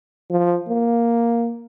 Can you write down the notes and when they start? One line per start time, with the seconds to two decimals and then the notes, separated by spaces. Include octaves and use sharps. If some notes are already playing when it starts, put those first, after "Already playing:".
0.30 F3
0.68 A#3